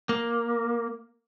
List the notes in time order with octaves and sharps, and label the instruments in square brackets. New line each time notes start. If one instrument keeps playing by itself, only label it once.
[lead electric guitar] A#3